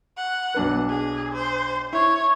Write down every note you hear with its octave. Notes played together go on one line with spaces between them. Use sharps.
F#5
B1 D4 B4
G#4
C5
E4 C#5